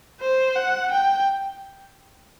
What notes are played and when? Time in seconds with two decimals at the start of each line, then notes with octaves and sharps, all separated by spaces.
0.20 C5
0.55 F#5
0.91 G5